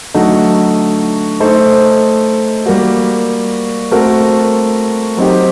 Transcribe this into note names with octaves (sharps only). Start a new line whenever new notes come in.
D3 F#3 A3 D#4 F#4
A3 D#4 A4 C5 D#5
G3 A#3 F#4
A3 C4 F#4 A#4
F#3 C4 D#4 G4